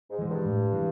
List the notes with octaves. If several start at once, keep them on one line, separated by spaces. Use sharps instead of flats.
G#2
E3 G#3
G2
A2
E3 G#3